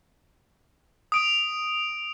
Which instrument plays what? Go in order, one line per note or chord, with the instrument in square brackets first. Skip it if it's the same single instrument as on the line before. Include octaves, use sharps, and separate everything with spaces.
[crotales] D#6 D7 F7